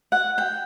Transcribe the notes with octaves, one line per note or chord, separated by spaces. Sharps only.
F#5
G5